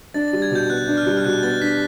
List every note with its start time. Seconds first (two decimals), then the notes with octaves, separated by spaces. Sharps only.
0.14 D4 A6
0.28 A6
0.33 G3
0.42 G#6
0.51 B2 G6
0.70 B3 F#6
0.88 D4
0.97 F6
1.06 G3
1.17 F6
1.25 B2 F#6
1.43 B3 A6
1.62 D4 B6